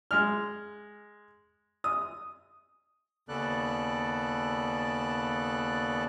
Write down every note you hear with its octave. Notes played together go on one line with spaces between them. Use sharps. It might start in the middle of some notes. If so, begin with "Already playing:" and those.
G#3 F6
D#6
D#2 C#3 B3 A4 D5 F#6